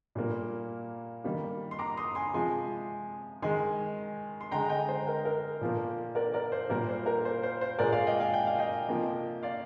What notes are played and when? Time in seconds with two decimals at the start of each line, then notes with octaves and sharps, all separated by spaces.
0.15 A#2 G3 A#3
1.24 D#3 G3 A#3
1.71 C6
1.79 A#5 D6
1.97 C6 D#6
2.15 G#5 C6
2.34 C3 F3 G#3 G#5 C6
3.42 D#3 G#3 G#5 C6
4.41 C6
4.51 D3 G#3 G5 A#5
4.70 D#5 G5
4.88 C5
5.07 A#4
5.25 A#4
5.61 A#2 F3 A#3
6.15 A#4 D5
6.34 A#4 D5
6.52 C5
6.69 A#2 G3 A#3 A#4
6.89 C5
7.06 A#4
7.25 C5
7.43 C5
7.61 C5
7.79 A#2 G#3 A#4 D5
7.92 D5 F5
8.07 D#5 G5
8.20 F5 G#5
8.33 G5
8.47 F5
8.59 D#5 G5
8.89 C3 F3 A#3
9.43 D5 F5